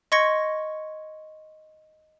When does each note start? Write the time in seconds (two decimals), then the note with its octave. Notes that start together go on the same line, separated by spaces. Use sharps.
0.12 D#5 C6 C#6 G#6 A#6 C#7